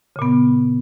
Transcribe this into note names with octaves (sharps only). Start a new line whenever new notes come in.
A#2 C#3 B3